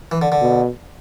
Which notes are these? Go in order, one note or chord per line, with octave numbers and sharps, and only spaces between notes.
E3
D3
D3
B2